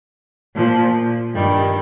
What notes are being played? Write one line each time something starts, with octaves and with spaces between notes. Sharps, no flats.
A#2 F3
G2 D#3 G3